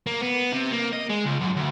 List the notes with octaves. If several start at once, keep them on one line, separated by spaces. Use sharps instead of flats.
A#3
B3
C3
A#3
D#5
G#3
C#2
F#2
D2